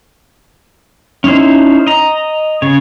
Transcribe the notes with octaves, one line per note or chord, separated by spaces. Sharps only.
C#4 D#4 E4 C5
D#5 A#5
C#3 C#5